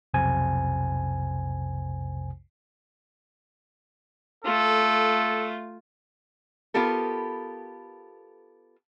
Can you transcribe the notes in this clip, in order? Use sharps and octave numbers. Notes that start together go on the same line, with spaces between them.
B1 F2 C3 C5 G#5
A3 F4 A4
B3 F4 G4 A4 A#4